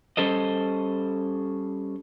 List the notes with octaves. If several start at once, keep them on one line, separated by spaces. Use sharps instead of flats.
G3 C#4 A4 C5 D#5